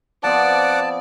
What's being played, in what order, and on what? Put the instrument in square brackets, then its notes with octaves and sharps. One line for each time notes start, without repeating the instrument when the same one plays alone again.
[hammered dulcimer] F3 B3 C4 [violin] D5 [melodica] F#5 D6 [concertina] A5